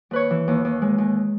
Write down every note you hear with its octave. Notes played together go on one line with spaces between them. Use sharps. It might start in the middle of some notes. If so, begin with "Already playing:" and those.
D#2 B4 C#5
E3
D#2
D#2
G#3
D#2